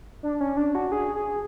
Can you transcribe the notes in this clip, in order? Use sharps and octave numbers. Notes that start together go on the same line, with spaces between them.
D4
C#4
D4
F#4
G#4
G#4